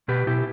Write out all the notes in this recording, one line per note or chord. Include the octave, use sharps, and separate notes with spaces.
B2 G4 B4
B2 E4 G4